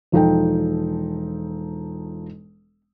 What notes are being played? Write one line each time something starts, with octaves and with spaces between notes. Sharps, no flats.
E1 F3 D#4 A4 G5